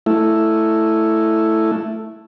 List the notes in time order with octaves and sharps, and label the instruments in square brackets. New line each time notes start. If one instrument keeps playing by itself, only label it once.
[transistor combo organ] A3 E4